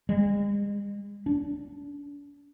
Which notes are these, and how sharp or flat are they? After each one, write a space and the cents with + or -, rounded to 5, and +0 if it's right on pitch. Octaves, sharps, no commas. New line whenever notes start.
G#3 -40
D4 -40